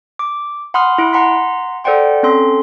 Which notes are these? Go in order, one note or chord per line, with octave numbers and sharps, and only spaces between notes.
D6
F#5 B5 C6 D#6 F6
E4 D7
F#5 A#5 C6 B6
A4 C5 D5 F#5 G5 C6
C4 C#4 A4 C6